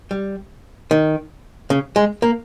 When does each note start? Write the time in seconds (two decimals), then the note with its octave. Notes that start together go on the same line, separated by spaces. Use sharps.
0.11 G3
0.91 D#3
1.70 C#3
1.96 G#3
2.22 A#3